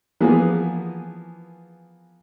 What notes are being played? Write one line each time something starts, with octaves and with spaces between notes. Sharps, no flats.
E3 F3 A#3 B3 G#4 A#4